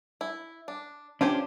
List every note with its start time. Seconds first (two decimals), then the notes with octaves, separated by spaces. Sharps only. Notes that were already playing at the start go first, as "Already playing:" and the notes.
0.21 E4
0.68 D4
1.21 C#4 D4 F4 G4 C5